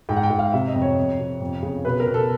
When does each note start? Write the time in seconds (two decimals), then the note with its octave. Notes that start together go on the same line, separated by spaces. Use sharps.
0.09 G#2 G5
0.16 F#5
0.23 G5
0.30 G#2
0.39 F5
0.52 C3 E5
0.68 D#5
0.74 F2
0.82 C#5
0.97 F2
1.19 C3
1.41 F2
1.63 C#3
1.84 B2 B4
2.00 A#4
2.07 B2
2.14 A4